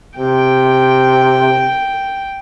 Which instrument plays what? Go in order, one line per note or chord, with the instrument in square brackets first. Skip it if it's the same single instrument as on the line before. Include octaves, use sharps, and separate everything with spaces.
[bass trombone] C3 [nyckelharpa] G5